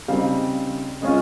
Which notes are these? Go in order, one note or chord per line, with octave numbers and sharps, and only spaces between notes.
C#3 G3 C4 D#4 F5
C#3 G#3 C#4 F4 D#5